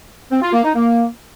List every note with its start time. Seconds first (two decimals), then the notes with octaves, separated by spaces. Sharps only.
0.31 C4
0.42 F4
0.53 A#3
0.64 D#4
0.75 A#3